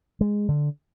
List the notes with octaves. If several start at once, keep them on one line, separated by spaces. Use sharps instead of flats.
G#3
D3